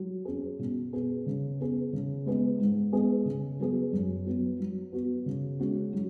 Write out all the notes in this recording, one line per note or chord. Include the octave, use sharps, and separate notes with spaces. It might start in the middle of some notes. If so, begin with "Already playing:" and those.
Already playing: F#3
C#4 G#4
B2
B3 G#4
C#3
B3 G#4
C#3
G#3 B3 G#4
G#2
G#3 B3 G#4
C#3
F#3 B3 G#4
F#2
F#3 B3
F#3
B3 F#4
C#3
G#3 C#4 F#4
F#3